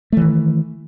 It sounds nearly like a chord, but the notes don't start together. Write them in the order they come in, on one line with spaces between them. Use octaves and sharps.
A3 E3 D#3